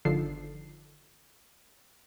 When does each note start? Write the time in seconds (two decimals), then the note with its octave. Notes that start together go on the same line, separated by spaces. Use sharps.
0.05 G1 D3 D#3 F3 A4 C7